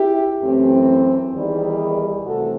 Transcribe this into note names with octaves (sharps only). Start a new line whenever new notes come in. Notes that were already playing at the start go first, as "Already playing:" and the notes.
Already playing: E4 G4
F#2 E3 A3 C4
E2 D#3 G3
C3 E3 A3 C4 F#4 A4